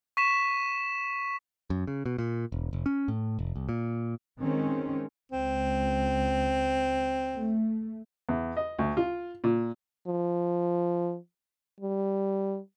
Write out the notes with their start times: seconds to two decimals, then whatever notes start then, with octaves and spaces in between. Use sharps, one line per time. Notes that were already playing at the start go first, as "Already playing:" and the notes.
0.17 C#6 B6 E7
1.70 F#2
1.87 C#3
2.06 B2
2.18 A#2
2.52 E1
2.73 F1
2.86 C#4
3.08 A2
3.39 F1
3.56 C2
3.69 A#2
4.39 D#3 G#3 C4 C#4
5.32 C#2 C4
7.35 A3
8.29 E2
8.57 D#5
8.79 D2
8.97 F4
9.44 A#2
10.07 F3
11.81 G3